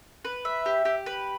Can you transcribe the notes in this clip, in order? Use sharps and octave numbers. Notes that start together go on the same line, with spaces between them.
B4
E5
G4
G4
B4